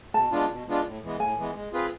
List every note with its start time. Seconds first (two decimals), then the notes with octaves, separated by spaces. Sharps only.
0.14 B2 A5
0.32 G#3 B3 D4 F4
0.50 B2
0.68 G#3 B3 D4 F4
0.84 A2
1.03 E3 G#3 B3
1.20 A2 G#5
1.37 E3 G#3 B3
1.55 G#3
1.73 C4 F4 G#4 B4